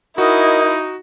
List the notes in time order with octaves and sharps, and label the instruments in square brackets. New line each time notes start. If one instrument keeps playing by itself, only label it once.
[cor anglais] D#4 [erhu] E4 [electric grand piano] F#4 [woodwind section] A#4 D#5